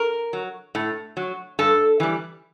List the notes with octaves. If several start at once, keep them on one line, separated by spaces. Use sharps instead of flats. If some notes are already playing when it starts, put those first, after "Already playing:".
Already playing: A#4
F#3
A2
F#3
G2 A4
E3 G3